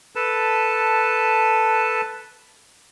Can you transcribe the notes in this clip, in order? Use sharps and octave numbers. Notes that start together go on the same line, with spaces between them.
A4 B4 A5